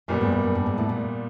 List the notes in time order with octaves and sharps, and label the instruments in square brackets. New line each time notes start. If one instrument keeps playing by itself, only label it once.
[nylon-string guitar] F#2 [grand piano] A#2 G3 B3
[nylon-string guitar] G#2
F#2
F#2
G2
G#2
A2
A#2